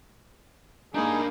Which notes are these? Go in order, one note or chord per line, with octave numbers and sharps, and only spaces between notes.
A#3 D4 D#4 G#4 B5